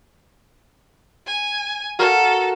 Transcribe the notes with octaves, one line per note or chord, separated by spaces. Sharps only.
G#5
F#4 A4 A#4 F5